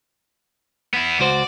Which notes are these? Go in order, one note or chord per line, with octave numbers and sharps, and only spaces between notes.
B3 E4
C#2 F#4 C5 D5